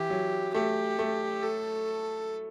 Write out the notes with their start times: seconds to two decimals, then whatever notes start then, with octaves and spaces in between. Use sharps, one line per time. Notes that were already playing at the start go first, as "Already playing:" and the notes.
Already playing: E3 G4
0.10 F#3
0.54 A3 G4
0.99 A3
1.43 A4